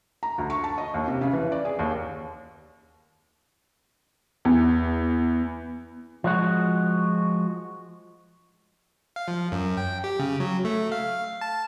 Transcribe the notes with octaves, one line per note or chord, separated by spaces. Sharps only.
A#5
D2
C#6
A5
D#5
D#2
C3
C#3
E3
D5
G#4
D#2
E2
F3 G#3 F#4
F5
F3
F#2
G5
G4
C#3
F#3
A3
F5
A5